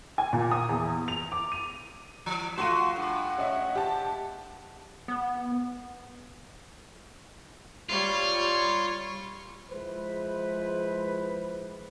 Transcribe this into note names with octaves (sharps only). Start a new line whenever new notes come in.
G#5
A#2
D#6
E2
F7
D6
D#7
E3
A3 F4 F#4 C6 D#7
G2 F#5
C#4 D#5 E5
G4 A5
B3
G3 F4 C#5
F3 G#3 E4 B4 C5